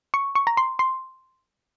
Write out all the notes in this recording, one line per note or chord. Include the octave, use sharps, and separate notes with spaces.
C#6
C#6
A#5
C6
C6